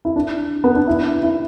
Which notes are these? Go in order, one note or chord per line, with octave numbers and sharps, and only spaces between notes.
E4
D4
B3
D4
E4
E4